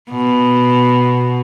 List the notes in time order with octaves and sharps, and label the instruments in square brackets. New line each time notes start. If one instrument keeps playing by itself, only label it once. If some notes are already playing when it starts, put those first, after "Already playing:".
[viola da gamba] B2